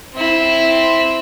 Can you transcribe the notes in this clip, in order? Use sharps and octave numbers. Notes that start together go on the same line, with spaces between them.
C4 E4